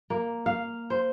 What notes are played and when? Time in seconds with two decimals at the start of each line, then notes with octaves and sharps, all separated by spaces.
0.10 A#3
0.46 F5
0.90 C5